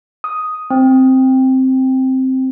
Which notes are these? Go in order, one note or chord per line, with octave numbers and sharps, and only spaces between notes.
D#6
C4